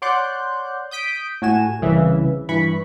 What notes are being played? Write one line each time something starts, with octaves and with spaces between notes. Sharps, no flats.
C#5 D5 F#5 C6 F#6 G6
D#6 G6 B6 D7
A2 F#4 G#5 E7
C2 C#3 E3 E5
G2 E3 B5 C#6